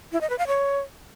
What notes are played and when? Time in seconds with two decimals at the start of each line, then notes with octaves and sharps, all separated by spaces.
0.12 E4
0.21 D#5
0.30 B4
0.38 F5
0.47 C#5